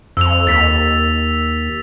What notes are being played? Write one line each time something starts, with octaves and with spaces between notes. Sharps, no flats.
F2 E6 F7
D#2 A6 B6 F7